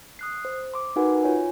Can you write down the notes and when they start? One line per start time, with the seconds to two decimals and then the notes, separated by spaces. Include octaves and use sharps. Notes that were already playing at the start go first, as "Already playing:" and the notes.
0.19 D#6 F#6 C7
0.45 C5
0.74 C6 D6
0.96 D#4 F#4 A#4 B4 F#5 G#5
1.24 F4 C#5 G#5